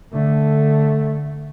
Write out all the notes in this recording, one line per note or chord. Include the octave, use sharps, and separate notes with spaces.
D3 A3